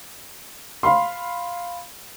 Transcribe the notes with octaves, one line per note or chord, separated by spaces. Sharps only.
F5 B5 C6